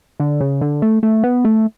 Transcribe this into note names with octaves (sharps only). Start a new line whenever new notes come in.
D3
C#3
D3
A3
A3
B3
A3